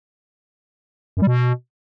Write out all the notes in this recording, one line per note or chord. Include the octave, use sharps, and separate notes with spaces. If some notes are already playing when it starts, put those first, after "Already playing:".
F#2
G3
B2